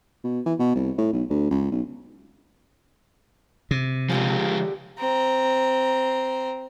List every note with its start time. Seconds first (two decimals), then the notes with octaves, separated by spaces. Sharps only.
0.24 B2
0.46 E3
0.59 B2
0.75 C2
0.98 A2
1.13 B1
1.30 D2
1.51 C#2
1.72 B1
3.71 C3
4.10 D3 F3 G#3 G4 G#4
4.99 C4 A#5